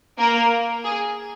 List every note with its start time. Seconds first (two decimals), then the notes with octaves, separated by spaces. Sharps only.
0.18 A#3 A#4
0.84 G#4